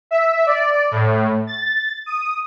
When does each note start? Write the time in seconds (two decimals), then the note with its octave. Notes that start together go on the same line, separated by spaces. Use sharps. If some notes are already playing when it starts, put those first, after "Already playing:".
0.11 E5
0.46 D5
0.91 A2
1.47 A6
2.06 D#6